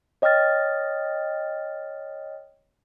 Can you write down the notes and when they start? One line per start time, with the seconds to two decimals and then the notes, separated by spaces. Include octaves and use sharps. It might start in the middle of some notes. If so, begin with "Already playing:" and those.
0.22 C#5 D#5 G5 D#6 F6 A6